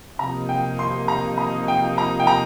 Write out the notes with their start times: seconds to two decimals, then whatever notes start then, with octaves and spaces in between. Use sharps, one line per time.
0.19 C3 F3 A#3 D#4 A#5
0.49 G5
0.79 C6
1.08 A#5
1.38 A#5
1.68 G5
1.98 A#5
2.20 G5
2.27 A#5